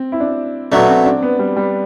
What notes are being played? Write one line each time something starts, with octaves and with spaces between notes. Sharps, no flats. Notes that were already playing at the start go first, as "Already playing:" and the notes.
Already playing: C4
E4
D4
B2 F#3 A3 D4
C4
D4
B3
G3
G3